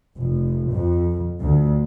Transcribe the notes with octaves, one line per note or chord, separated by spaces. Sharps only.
F1
F2
D2